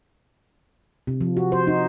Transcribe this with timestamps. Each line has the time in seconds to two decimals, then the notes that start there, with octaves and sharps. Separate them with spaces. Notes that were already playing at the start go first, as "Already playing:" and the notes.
1.07 C3
1.21 F3
1.37 F#4
1.52 C5
1.67 D#4